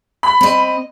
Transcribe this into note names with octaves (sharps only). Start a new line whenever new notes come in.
B5
C4 D#5